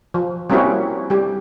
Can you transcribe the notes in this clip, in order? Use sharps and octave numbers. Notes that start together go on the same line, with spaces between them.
F3
G3 A#3 C4 C#4 E4 F#4
G3 G4